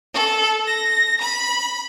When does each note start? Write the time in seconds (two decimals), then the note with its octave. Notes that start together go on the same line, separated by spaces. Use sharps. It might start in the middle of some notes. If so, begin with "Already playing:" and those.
0.13 A4
0.66 A#6
1.19 B5